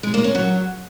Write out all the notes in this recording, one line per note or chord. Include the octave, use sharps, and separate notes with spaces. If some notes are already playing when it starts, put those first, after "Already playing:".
G#3
A#3
C#4
F#3